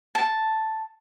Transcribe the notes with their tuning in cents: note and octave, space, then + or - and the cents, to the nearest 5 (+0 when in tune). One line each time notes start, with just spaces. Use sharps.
A5 +0